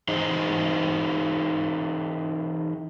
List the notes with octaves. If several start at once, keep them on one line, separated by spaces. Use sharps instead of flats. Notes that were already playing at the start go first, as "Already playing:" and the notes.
E3 D#4 G#4 C5 D#5